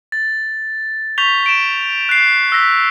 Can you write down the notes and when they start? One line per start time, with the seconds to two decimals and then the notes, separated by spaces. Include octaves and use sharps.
0.12 A6
1.18 C#6 G6 B6 F7 G7
1.46 D7 E7
2.09 F#6 C7
2.52 E6 F#6 A#6 B6